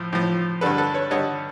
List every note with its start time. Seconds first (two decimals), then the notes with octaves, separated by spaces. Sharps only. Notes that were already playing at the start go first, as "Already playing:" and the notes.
Already playing: A2 F3
0.13 A2 F3
0.61 G2 D3 G3 A4 B4
0.78 A4 B4
0.94 B4 C#5
1.10 G2 D3 G3 C#5 D#5